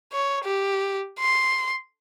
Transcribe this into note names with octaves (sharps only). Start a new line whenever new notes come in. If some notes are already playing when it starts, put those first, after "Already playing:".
C#5
G4
C6